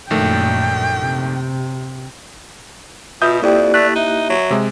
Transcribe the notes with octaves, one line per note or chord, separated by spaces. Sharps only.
A#1 F#2 A#2 D#3 A3 G5
C3
B2 F4 E5 D#6 G6
F2 A#3 E4 G4 D5
A3 F#6
D#4 E5
F#3
C3 G#3